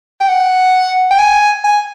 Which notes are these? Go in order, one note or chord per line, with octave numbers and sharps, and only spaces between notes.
G5
F#5
G5
G#5
G#5